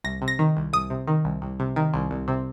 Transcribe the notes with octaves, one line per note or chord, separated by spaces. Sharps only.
C2 A#6
C3
A#6
D#3
C2
C2 D#6
C3
D#3
C2
C2
C3
D#3
C2
C2
C3